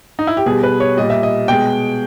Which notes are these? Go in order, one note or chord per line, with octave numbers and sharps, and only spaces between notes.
D#4
E4
G4
B2 G3 G#4
B4
C#5
A#2 G3 D#5
E5
D#5
B2 G#3 G5